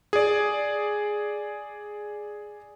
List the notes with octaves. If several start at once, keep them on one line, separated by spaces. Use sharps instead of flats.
G#4 D5